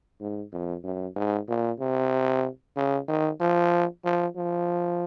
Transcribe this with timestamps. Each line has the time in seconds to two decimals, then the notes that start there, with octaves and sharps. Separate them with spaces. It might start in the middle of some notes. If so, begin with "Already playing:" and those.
0.21 G#2
0.53 F2
0.84 F#2
1.16 G#2
1.49 A#2
1.80 C3
2.77 C#3
3.09 D#3
3.40 F3
4.05 F3
4.36 F3